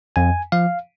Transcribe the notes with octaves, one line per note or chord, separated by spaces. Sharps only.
F2 G#5
F3 F5